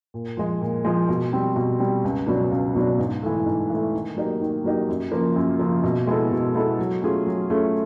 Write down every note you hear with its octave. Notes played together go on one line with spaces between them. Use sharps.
A#2
F3 G#3
A#2
F3 G#3
B2
G3 C4
B2
G3 C4
C#2
B2 F#3 B3 D4
C#2
B2 F#3 B3 D4
G#2
E3 A3
G#2
E3 A3
D#3
F#3 A#3 D#4 G4
D#3
F#3 A#3 D#4 G4
F#2
C#3 F3 A#3
F#2
C#3 F3 A#3
B2
G#3 B3 E4 A4
B2
G#3 B3 E4 A4
F#3
A3 C#4 F4 G#4
F#3
A3 C#4 F4 G#4